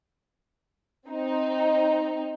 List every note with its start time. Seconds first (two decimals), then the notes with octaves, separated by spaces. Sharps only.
1.08 C4 D#4